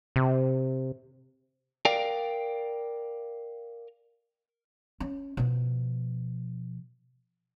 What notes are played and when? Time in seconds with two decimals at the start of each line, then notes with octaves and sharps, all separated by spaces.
0.16 C3
1.85 A#4 D5 F5 G5
5.00 C#4
5.37 B2 F3